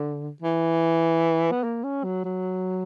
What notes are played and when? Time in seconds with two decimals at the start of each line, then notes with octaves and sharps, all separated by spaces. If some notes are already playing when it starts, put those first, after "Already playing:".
Already playing: D3
0.42 E3
1.52 B3
1.63 A#3
1.84 C#4
2.04 F#3
2.25 F#3